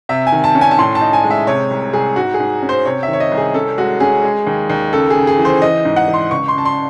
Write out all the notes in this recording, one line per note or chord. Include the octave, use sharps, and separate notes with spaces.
C3 E5
G#5
D#3
A5
C#4
G#5
A5
A2 C6
A5
D#4
G#5
G#3
E5
C3 C#5
C2
C2 G#4
G#2 F#4
G#4
G#2
C#4
C5
C3 C#5
E5
D#3
C#5
D#5
C2
G#4
C#4 A4
G#3 F#4
C#4 G#4
G#3
D#2
D#2
C#3 A4
G#4
C#3
G#4
E3
C5
E3 D#5
G#2
F#5
E3
C6
C#2 C#6
C6
C#3 A5
C6